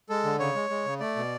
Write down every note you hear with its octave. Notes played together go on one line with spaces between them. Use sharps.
G#3 A4
D3
C#3 C#5
G#3
G#3
C#3
A3 D5
B2